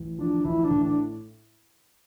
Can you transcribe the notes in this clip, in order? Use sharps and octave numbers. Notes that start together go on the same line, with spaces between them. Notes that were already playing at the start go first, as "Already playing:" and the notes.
Already playing: A1
F3 D4
A1 E4
D4
A2
D4